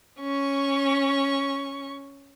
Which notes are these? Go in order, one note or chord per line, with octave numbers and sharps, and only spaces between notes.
C#4 C#6